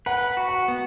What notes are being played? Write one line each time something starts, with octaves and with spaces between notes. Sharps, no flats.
B4 F#5
F#5
F#4
F#5
B3